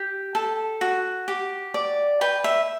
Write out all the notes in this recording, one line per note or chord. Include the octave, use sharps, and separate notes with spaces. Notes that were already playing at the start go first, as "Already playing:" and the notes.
Already playing: G4
A4
F#4
G4
D5
B4 G5
E5